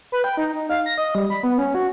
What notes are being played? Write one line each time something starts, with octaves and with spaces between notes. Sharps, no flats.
B4
G5
D#4
D#4
F5
A#6
D#5
G3
B5
B3
C#4
F#4